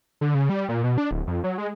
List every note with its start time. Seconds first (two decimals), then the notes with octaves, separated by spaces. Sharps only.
0.21 D3
0.35 C#3
0.49 G3
0.69 A#2
0.84 B2
0.98 D4
1.11 D1
1.27 F2
1.44 F#3
1.58 G#3